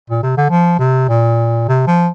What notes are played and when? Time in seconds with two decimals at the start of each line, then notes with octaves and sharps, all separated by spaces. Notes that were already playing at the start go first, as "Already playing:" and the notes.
0.10 A#2
0.23 C3
0.37 D3
0.50 F3
0.79 C3
1.09 A#2
1.68 C3
1.87 F3